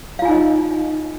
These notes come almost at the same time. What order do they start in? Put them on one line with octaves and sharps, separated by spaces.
F5 F4 G#5 D#4 D#5